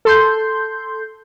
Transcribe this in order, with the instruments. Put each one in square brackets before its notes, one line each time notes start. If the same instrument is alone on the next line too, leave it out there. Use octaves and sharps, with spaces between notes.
[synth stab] A4 C6 G6